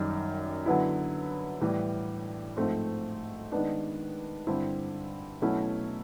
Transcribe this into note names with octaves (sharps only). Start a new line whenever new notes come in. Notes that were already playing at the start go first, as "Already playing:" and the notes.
Already playing: F#2 D#3 G3
D3 F#3 B3 E4
A2 E3 G3
G#2 F3 A3 C4
D#3 G#3 B3 D4
G2 D3 G3 C4 E4
B2 F#3 A3 C#4 E4